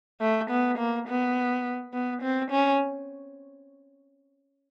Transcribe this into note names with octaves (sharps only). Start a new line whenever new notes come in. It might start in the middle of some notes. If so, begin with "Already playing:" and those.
A3
B3
A#3
B3
B3
C4
C#4